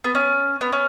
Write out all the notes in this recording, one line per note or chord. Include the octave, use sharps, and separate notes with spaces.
B3
C#4
B3
C#4